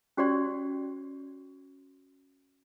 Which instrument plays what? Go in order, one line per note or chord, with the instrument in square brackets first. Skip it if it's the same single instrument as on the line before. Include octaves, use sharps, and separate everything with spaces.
[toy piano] C#4 F#4 G4 C#5 D5 C6